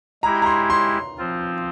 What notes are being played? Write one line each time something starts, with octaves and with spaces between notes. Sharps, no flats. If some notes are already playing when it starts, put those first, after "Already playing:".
G#3 E4 G4 A#5
A#5
C6
C6
F3 C4 F4